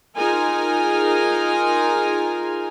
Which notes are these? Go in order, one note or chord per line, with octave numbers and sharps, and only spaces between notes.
D#4 F4 G#4 A#4 G#5